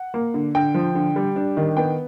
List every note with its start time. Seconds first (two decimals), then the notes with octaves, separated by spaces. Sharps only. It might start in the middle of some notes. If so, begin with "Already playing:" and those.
Already playing: F#5
0.14 A#3
0.34 D3
0.55 D3 G5
0.74 F3
0.95 D3
1.16 G3
1.36 D4
1.57 D#3
1.77 B3 G5